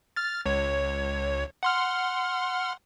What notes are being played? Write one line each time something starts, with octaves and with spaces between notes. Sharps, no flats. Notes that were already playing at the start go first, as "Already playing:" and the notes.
F6 A6
C#2 C#5
F#5 C6 F6